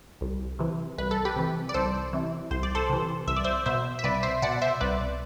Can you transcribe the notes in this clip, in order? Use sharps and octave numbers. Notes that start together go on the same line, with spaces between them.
C2
C3 E3
C2 B4
A4
G4 B4
C3 E3
D5
C2 A4 C5
C3 E3
C2 C5
D5
A4 C5
C3 E3
C2 E5
D5
C5 E5
B2 C5 E5
E5
C2 B4 D5
C5 E5
B2 D5 F#5
C5 E5
C2 B4 D5